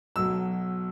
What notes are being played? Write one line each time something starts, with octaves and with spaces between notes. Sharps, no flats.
B1 B2 F#3 E6